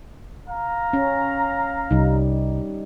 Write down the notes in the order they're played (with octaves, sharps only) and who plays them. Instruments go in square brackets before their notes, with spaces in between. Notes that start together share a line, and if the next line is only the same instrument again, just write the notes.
[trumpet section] F5 A#5
[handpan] C#4
[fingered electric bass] C2 [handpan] G3 D#4